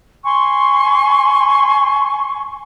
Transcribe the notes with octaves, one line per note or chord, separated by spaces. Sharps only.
G#5 C6 C#6